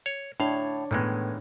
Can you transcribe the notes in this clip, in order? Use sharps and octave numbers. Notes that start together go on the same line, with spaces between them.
C#5
A2 D4 C#5 F5
A2 D#3 E3 G#3 B3